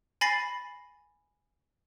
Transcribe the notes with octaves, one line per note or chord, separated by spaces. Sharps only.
G#5 B5 A6 A#6 C7